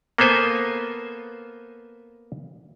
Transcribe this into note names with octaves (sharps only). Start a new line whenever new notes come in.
A#3 B3 A4 C5 G#5